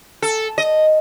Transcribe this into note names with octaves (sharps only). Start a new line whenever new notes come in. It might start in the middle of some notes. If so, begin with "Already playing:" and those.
A4
D#5